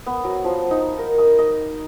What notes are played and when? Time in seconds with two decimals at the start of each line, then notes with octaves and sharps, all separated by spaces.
0.06 B3
0.24 F#3
0.44 F3
0.71 D#4
0.98 A#4
1.18 D#6
1.39 D#5